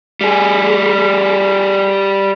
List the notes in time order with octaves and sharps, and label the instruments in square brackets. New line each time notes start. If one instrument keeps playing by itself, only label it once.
[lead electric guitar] G3 G#4